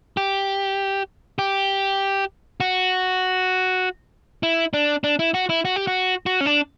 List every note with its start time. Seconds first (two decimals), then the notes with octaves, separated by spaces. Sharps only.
0.17 G4
1.39 G4
2.60 F#4
4.43 E4
4.74 D4
5.04 D4
5.19 E4
5.34 F#4
5.49 E4
5.65 F#4
5.76 G4
5.87 F#4
6.26 F#4
6.41 C#4
6.46 D4